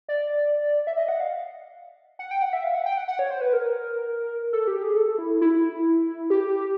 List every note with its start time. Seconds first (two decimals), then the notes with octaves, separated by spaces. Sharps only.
0.09 D5
0.87 E5
0.97 D#5
1.08 F#5
1.20 F5
2.19 F#5
2.31 G5
2.42 F#5
2.53 E5
2.64 F5
2.75 F#5
2.86 G5
2.97 F#5
3.08 F#5
3.19 C#5
3.30 C5
3.41 B4
3.53 A#4
4.53 A4
4.67 G4
4.83 G#4
4.97 A4
5.18 E4
5.41 E4
6.30 G4